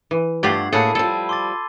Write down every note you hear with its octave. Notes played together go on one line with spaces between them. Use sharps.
E3
G2 A3 F4 G4 D5 F#5 G#6 C7
A2 A#3 G#4 A4 F#5 A5 B5 D#7
F3 G3 A4 E6
C6 D6 A6